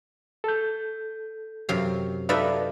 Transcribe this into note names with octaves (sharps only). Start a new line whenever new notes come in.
A4 G6
F#2 C3 F5
D#4 A4 B4 D5 E5 F5